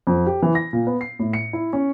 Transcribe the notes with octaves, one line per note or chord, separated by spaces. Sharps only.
F2
G4
E3
A#6
A#2
B3
C7
A2
C#7
E4
C#4